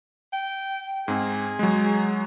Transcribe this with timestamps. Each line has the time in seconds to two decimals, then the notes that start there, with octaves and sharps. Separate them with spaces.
0.33 G5
1.08 G#2 C4 G#4
1.59 F#3 G#3